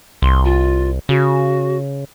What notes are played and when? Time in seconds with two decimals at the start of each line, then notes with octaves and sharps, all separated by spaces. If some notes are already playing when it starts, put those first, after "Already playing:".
0.22 C2 C6
0.44 F4
1.09 C#3 F#4